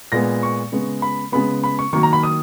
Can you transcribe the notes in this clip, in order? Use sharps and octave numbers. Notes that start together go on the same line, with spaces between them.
A#2 G#3 B3 A#6
C#6
C#3 G#3 B3
B5
C#3 G#3 B3 B5
B5
C#6
D#3 F#3 A#3 C#6
A#5
B5
D#6